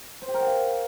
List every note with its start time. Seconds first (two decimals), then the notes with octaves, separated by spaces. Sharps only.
0.22 C5
0.28 G4
0.34 A#4
0.41 F#5
0.47 F5